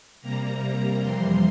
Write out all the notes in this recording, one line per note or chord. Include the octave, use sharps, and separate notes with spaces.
C3 G3 A#3 A#5
F2 C3 E3 G3 C6